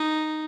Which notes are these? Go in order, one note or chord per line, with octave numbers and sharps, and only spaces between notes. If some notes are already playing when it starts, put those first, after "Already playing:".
Already playing: D#4